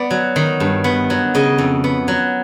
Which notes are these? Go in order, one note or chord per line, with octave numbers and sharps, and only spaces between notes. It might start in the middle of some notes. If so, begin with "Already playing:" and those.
Already playing: B3 D5
F#3
D#3
G2
B3
F#3
C#3 D#5
F2
B3
F#3